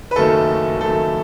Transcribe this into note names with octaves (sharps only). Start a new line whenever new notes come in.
B4
F#1 F#2 D#3 A3 A4
F#1 F#2 D#3 A3 A4